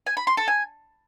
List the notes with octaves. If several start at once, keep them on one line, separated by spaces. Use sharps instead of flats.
G#5
B5
C6
A4
G#5